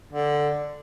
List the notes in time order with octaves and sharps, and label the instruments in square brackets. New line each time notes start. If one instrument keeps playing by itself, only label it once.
[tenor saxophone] D3